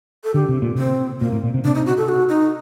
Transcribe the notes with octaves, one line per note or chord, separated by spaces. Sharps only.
A4
D3 G4
C3
A#2
C3 C4
A#2 A#3
A2
A#2
C3
C3 D4
D#4
F#4
A4
F#4
D#4